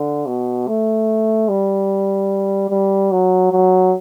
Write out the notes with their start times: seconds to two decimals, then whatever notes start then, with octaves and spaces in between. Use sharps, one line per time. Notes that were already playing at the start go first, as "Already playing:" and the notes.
Already playing: D3
0.26 B2
0.68 A3
1.49 G3
2.70 G3
3.12 F#3
3.52 F#3